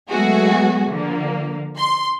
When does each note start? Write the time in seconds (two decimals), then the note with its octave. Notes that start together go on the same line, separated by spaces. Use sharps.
0.11 F#3 G#3 A3 B3 F#4 G#4
0.90 D3 F3 A#3
1.79 C6